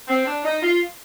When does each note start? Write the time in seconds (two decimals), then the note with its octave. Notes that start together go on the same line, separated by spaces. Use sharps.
0.08 C4
0.26 D4
0.45 D#4
0.62 F4